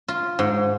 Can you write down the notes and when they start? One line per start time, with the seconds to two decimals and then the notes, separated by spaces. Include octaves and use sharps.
0.08 F4
0.39 G#2